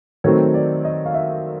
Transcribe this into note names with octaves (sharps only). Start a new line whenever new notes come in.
D#3 F#3 A3 C4 C#5
D5
D#5
F5
E5